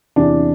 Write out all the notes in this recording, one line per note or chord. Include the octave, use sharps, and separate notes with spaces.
E2 C3 E3 D4